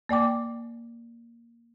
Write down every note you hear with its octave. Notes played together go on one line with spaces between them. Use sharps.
A#3 D5 G5 D6